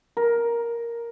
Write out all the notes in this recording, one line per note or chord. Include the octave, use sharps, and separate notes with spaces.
A#4